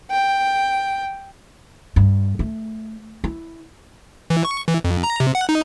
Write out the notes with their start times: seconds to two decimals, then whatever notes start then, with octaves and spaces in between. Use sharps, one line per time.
0.10 G5
1.96 G2
2.39 A3
3.24 E4
4.30 E3
4.45 C#6
4.68 E3
4.84 F2
5.04 A#5
5.20 C3
5.35 F#5
5.49 D#4